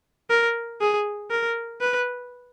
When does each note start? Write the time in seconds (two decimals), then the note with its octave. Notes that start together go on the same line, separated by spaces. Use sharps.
0.30 A#4
0.81 G#4
1.30 A#4
1.81 B4